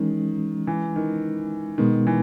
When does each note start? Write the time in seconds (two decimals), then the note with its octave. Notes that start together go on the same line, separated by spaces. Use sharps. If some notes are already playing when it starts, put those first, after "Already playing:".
Already playing: D#3 E3 G#3 C#4
0.67 E3
0.96 D#3
1.78 B2 D#3 G#3 B3
2.07 E3